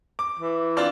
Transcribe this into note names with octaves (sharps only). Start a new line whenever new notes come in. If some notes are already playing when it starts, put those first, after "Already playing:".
D6
E3
C4 D4 F4